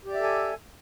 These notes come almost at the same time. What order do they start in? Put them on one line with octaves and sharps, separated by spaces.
G4 D5 E5 A4 G#5